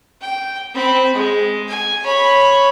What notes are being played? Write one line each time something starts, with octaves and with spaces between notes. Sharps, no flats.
G5
C4 B5
G#3
G#5
C#5 B5